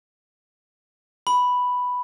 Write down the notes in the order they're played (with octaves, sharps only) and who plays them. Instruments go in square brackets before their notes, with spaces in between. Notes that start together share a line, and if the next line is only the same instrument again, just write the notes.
[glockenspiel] B5